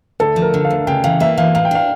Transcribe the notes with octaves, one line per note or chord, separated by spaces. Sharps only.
D2 A4
F3
A#4
D3
F5
D2
C#3 G5
E3 F5
A#3 E5
E3 F5
A2 F5
G5
D4 F5